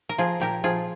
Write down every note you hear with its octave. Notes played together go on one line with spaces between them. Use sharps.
A#4
F3 F4 G#4
A#2 G4 A#4
F3 F4 G#4